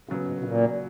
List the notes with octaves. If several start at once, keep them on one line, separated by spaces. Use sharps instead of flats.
A#2 C#3 F#3 B3
G#2
B2
A#2